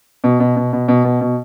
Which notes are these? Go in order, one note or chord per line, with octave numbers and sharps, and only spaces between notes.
B2
B2
B2
B2
B2
B2
B2